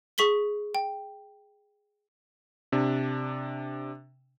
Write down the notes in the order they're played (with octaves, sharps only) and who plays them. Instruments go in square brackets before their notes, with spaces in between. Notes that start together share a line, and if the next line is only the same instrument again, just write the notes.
[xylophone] G#4 C#6 B6 F#7 G7
G5
[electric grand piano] C3 D4